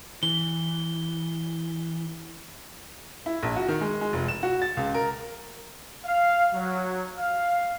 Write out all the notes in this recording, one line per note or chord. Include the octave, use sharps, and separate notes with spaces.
E3 G7
E4
A#1
F#4
D#3
G#3
G#3
F1
E7
F#4
A6
C#2
A#4
F5
F#3
F5